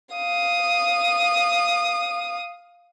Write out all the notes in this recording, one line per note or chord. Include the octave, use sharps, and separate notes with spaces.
F5 D#6